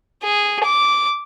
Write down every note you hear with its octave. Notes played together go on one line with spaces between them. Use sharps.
G#4
D6